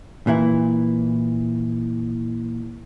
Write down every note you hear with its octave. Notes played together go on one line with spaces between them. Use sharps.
A#2 E3 E4